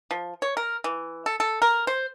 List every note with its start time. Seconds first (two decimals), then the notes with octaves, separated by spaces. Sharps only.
0.11 F3
0.42 C#5
0.57 A#4
0.84 E3
1.26 A4
1.40 A4
1.62 A#4
1.87 C5